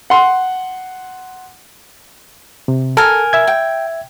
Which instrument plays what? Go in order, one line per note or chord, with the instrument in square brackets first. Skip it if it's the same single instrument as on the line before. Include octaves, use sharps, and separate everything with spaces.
[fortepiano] F#5 C6
[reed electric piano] C3
[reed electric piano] A4 [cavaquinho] A#4 G#5
[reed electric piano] E5 G#6
[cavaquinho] G5